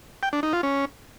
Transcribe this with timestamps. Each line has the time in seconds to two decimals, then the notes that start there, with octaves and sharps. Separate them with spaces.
0.23 G5
0.33 D4
0.43 D#4
0.53 F4
0.63 C#4